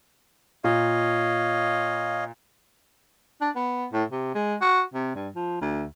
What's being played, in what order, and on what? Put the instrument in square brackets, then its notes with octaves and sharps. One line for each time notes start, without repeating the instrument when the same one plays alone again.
[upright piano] A#2 [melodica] C#5 D#5 F5
[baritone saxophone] D4
B3
A2
C3
G#3
F#4
C3
G2
F3
D2